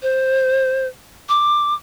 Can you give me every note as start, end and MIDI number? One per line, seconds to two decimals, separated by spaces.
0.02 0.87 72
1.29 1.74 86